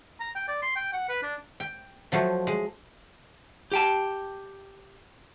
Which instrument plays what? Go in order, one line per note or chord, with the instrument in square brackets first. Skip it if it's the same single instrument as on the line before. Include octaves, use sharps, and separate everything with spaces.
[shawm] A#5
G5
D5
C6
G5
F#5
B4
D4
[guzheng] G5
F3 F#3 A3 C5
G#3
[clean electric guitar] G4 G5 A5